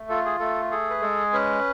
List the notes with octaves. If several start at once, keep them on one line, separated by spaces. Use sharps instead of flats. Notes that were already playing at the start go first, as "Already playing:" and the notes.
Already playing: A3
F4 A4
G#4
A3 A4
G#4 A4
B4
G#3 A4
C#4 B4